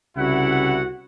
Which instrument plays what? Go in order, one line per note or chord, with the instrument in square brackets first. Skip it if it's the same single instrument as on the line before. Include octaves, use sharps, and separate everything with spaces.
[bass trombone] C2 [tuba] C#3 [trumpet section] E4 F#5 [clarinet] F#4